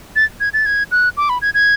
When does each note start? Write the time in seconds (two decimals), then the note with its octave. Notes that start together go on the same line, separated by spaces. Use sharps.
0.16 A6
0.40 G#6
0.53 A6
0.66 G#6
0.91 F#6
1.17 D6
1.29 B5
1.42 G#6
1.54 G#6